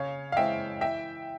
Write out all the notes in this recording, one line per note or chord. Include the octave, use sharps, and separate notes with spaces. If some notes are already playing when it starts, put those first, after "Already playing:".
Already playing: C#3 C#5 F5
F5
E3 G#3 C4 E5 G5
E3 E5 G5